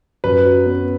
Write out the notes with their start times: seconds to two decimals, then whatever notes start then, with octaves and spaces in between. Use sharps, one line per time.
0.24 F#2 B4
0.46 F#3
0.66 B3